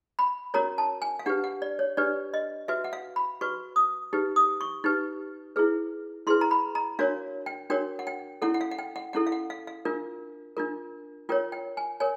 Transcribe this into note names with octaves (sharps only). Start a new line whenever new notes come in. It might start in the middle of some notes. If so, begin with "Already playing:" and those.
B5
C#4 F#4 A#4 C#5 A#5
A5
G#5
F5
D4 G4 B4 F#5
F#5
D5
C#5
D4 G4 B4 D5
D#5
F#4 B4 E5
F#5
F5
B5
F#4 B4 C#6
D#6
D#4 G4 B4
D#6
C#6
D#4 G4 B4
E4 G#4 B4
E4 G#4 B4 C6
A#5
B5
A#5
D4 F#4 A#4 C#5 F5
G5
D4 F#4 A#4 C#5 G5
F#5
G5
C#4 E4 A4 F#5
F#5
F5
F#5
G5
F#5
C#4 E4 A4 F#5
F5
F#5
F5
F5
D4 F4 A#4
D4 F4 A#4
F4 A#4 C#5 G5
G5
G#5
A#4 C#5 G#5